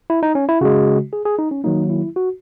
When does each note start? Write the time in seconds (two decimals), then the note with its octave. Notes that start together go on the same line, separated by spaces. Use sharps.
0.10 E4
0.23 D#4
0.35 C#4
0.49 E4
0.61 C#3 G#3 F#4
1.13 G#4
1.25 G#4
1.39 D#4
1.51 C#4
1.64 D#3 F#3 A#3 D#4
1.90 E4
2.16 F#4